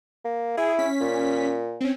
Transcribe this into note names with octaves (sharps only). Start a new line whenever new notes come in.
A#3
E4 G#4
C#4 B6
A#2
C4 C#4